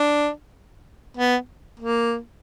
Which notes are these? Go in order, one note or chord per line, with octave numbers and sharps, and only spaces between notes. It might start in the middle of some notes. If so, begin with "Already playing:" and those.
Already playing: D4
B3
A#3